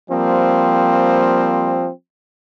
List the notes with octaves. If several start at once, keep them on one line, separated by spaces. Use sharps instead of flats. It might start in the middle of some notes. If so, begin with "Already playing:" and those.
F3 G3 A#3 C4